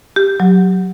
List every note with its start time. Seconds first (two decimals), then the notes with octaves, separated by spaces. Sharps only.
0.16 G4
0.40 F#3